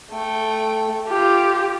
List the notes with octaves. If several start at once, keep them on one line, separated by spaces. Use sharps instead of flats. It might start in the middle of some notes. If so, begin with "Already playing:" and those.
A3 G5
F4 G4